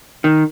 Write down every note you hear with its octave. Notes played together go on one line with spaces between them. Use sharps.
D#3